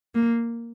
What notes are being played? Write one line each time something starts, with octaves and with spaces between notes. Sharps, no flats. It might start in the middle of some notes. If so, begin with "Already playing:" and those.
A#3